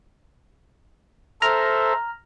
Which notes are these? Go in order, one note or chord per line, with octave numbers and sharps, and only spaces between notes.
A4 C5 E5 A#5 F6